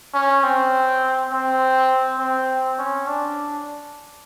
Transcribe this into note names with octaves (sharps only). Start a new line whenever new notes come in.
C#4
C4
C4
C4
C#4
D4